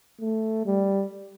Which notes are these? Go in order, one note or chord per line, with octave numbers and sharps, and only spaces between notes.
A3
G3